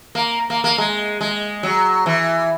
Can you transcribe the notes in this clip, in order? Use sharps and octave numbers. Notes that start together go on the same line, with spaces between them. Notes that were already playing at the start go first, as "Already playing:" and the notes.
A#3
A#3
A#3
G#3
G#3
F#3
E3